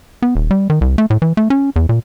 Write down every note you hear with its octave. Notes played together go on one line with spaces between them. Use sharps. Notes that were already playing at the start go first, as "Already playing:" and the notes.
B3
D#1
G3
D#3
C2
A3
A2
E3
A3
C#4
E2
A#2